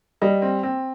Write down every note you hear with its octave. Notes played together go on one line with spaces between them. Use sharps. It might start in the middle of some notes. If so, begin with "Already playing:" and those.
G3 D#5
C4
C4